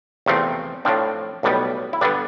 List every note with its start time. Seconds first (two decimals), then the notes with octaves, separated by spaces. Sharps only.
0.26 E2 C3 F3 A3 C4
0.85 A2 F3 C4 D4
1.43 B1 A2 G3 B3
1.93 E4
2.01 G2 D3 G3 B3 D4